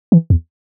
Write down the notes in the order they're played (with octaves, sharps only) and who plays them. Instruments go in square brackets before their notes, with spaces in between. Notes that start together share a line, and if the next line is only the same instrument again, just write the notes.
[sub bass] E3
E2